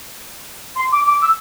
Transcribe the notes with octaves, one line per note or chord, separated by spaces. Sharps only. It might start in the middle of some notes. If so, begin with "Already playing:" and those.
C6
D6
D6
E6